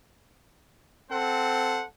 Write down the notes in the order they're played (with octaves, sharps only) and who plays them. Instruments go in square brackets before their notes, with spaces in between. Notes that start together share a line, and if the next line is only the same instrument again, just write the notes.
[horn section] C4 A4 C5 F#5